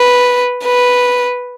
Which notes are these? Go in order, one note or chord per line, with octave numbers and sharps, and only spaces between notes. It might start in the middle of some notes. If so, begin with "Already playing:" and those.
Already playing: B4
B4